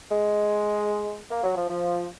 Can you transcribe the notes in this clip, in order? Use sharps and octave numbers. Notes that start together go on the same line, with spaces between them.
G#3
A#3
F#3
F3
F3